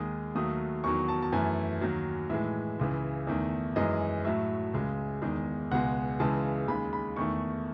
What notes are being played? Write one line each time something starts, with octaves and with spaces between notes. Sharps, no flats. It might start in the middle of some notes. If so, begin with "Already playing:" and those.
Already playing: D#2 D#3 G#3 D#6
D#2 D#3 F#3 A3 D#6
E2 D#3 F#3 C#6
A5
A5
F#2 E3 A3 G#5
D#2 D#3 F#3
A2 E3 G#3 E5
C#2 C#3 E3
E2 D#3 A3
F#2 E3 G#3 D#5
A2 F#3 A3 E5
C#2 C#3 G#3
E2 D#3 G#3
C#2 B2 G#3 F#5
C#2 C#3 E3 G#3 A5
D#2 C#3 G#3 B5
B5
E2 D#3 A3 C#6